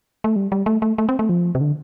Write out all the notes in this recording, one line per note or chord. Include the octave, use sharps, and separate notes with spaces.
A3
G3
G3
A3
A3
A3
C4
A3
F3
C3
D3